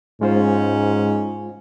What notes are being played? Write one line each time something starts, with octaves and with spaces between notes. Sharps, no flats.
G#2 G#3 C#4 F4 C5